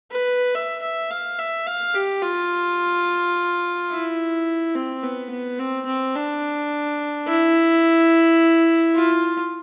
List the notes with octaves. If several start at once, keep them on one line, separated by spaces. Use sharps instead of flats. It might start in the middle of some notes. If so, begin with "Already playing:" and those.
B4
E5
E5
F5
E5
F5
G4
F4
E4
C4
B3
B3
C4
C4
D4
E4
F4